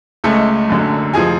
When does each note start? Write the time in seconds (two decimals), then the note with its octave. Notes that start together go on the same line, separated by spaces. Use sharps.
0.24 C#2 C#3 G#3 A3 C#4 A4
0.69 F#1 F#2 D3 F#3
1.14 F1 F3 G#4 G#5